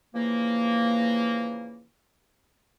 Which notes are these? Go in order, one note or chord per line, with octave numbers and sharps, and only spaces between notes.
C#3 E3 F3 A#3